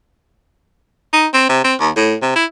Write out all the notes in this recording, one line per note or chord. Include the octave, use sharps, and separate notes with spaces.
D#4
C4
C3
C4
D#2
A2
C3
E4